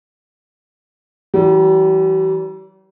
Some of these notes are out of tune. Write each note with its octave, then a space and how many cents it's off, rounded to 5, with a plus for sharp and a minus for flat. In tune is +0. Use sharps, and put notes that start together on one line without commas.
E3 +0 G3 -45